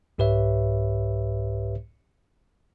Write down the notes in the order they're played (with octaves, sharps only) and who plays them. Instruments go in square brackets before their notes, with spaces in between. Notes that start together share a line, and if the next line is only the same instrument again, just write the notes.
[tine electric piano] C2 G#2 G4 B4 C#5 E5